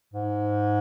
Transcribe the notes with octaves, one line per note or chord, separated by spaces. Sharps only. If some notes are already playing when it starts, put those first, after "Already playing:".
G#2